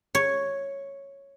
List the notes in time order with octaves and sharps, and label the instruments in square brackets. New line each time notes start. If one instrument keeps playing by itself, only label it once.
[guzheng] C#5